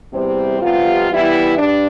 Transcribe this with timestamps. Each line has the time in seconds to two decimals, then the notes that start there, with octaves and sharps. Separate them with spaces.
0.12 E2 C3 E3 G3 C4
0.61 F2 C3 G3 B3 F4
1.09 E3 G3 B3 E4
1.58 G2 G3 D4